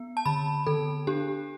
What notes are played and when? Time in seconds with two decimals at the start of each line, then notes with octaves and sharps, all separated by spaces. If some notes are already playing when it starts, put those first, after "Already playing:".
Already playing: B3
0.17 A5
0.26 D3 B5
0.67 D3 A4
1.07 D4 G4